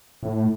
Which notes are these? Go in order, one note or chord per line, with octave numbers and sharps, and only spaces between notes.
A2